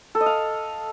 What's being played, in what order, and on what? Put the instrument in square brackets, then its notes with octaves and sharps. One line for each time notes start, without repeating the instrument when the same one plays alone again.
[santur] A4
D#5
F5